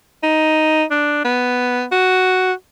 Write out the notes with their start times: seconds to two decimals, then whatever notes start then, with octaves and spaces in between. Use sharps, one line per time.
0.23 D#4
0.91 D4
1.25 B3
1.92 F#4